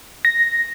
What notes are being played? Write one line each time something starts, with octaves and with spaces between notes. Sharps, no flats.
A#6